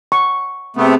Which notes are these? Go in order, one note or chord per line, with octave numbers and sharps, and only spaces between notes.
C#6
C3 A3 B3 C4 G#4